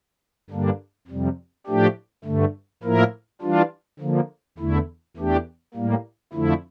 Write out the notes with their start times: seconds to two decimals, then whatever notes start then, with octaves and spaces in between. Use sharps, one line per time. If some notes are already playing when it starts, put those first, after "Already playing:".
0.50 G2 D3 G3 A#3 D4
1.08 F2 C3 G3
1.67 A2 F3 A3 D4 G4
2.25 G2 D3 A3
2.83 A2 F3 A#3 E4 A#4
3.42 E3 G3 D4 F4
3.99 D3 F3 A#3
4.58 E2 D3 A3 E4
5.17 E2 E3 A3 D4 G4
5.74 A2 G3 A#3
6.33 F2 D3 F3 A3 E4